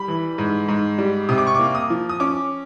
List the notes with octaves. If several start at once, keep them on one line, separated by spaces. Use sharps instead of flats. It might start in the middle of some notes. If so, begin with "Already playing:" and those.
Already playing: G3 B5
E3
G#2
G#2
G3
C3 D#6
D6
C#6
A#3 D6
D#6
F3
D#6
C#4 D6